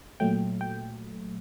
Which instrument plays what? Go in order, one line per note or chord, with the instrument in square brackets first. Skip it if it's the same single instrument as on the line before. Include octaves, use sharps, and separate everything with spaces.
[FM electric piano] A#2 F#3 A3 G5
G5